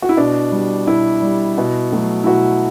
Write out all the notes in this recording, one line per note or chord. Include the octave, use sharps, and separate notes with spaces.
F#4
E4
B2 D4
G3
B2 E4
G3
B2
F#3 A3
E4
B2 F#4